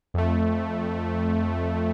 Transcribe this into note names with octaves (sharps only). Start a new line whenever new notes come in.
F2 A3